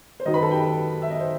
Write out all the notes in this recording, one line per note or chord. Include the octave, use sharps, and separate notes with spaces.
C5
F#2 D#3 F#3 D#4 D#5
B4 B5
A4 A5
G4 G5
E5
D#5
C5